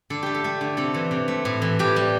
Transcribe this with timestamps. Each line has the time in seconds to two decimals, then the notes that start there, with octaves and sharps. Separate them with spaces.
0.10 D3 A4
0.23 A3 G4
0.35 A4
0.44 A3
0.61 D3
0.77 C3 A4
0.94 E3
1.11 C3
1.28 A3
1.45 A2
1.62 E3
1.79 A2 G4
1.96 G3